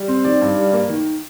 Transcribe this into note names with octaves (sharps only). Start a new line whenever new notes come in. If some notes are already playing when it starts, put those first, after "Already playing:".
Already playing: G3
C4
D#3 D5
G2
G3
A#3
D#3